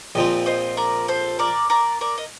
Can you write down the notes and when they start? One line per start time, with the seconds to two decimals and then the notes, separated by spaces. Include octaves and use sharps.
0.15 A#1 A#2 F3 C4 D#5 G5
0.46 C5 D#5
0.77 A#4 D5
1.08 A4 C5
1.39 A#4 D5
1.70 A#4 D5
2.01 A#4 D5
2.18 D#5